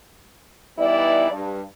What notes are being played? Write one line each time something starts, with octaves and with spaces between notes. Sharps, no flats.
E3 G3 B3 D#4 E4 D5
G2